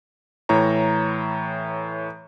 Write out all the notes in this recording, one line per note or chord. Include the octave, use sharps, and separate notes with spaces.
A2 E3 C#5 A#5